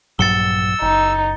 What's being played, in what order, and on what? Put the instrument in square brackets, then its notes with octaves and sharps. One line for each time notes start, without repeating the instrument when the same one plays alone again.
[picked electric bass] A#1 G2 F#3 [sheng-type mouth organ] E6 [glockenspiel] A6 C#7 G7
[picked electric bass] F#1 [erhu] D#4